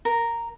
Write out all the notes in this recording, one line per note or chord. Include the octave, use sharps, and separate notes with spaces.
A#4